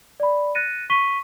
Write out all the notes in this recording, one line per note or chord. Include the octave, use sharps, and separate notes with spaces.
D5 B5
F#6 A6 A#6 C#7 D#7
C#6 B6 D#7 G7